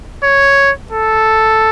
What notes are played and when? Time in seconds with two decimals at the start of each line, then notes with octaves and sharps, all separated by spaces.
0.24 C#5
0.92 A4